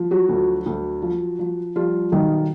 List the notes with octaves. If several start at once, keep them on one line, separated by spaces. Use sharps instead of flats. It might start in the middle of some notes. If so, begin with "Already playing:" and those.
Already playing: F3
F#3 F#4
D2
D2
F3
F3
F3 G3 F4
B1 D#3 D#4